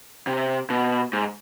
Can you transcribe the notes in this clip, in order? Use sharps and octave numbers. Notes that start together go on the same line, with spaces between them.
C3
B2
G#2